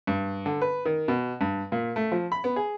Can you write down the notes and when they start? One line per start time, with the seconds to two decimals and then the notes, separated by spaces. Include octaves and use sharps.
0.07 G2
0.46 D3
0.61 B4
0.85 D#3
1.08 B2
1.41 G2
1.72 A#2
1.96 A3
2.12 F3
2.32 B5
2.44 B3
2.56 G#4